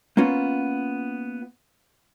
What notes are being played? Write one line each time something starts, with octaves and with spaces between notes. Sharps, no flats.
A#3 B3 C#4 F4